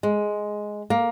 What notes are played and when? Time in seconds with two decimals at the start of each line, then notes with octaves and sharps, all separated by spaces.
0.03 G#3
0.90 A#3